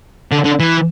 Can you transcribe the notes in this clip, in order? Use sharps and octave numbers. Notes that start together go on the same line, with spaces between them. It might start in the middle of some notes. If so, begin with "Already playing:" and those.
D3
D3
E3